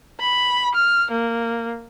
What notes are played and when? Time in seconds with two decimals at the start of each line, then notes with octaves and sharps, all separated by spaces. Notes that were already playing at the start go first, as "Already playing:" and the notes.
0.20 B5
0.75 F6
1.11 A#3